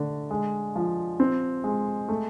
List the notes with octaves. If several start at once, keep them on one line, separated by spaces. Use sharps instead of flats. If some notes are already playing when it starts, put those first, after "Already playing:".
Already playing: D3 A3
G#3
F3
C4
G#3
A3